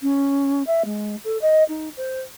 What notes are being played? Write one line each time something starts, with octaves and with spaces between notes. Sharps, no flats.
C#4
E5
G#3
A4
D#5
D#4
C5